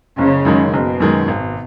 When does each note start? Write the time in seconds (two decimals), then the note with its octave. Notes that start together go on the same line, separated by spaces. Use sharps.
0.17 F#1 C#3
0.45 F#2 D#3 G#3
0.73 F#1 B2
1.00 F#2 D#3 G#3
1.28 G#1